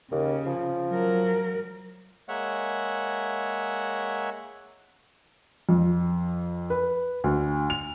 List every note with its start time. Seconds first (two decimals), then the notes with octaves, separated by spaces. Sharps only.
0.11 D#2 C#3
0.46 F3
0.90 F#3 A#4
2.29 G#3 A#3 C#5 E5 F#5
5.69 F2
6.70 B4
7.24 D2
7.70 F7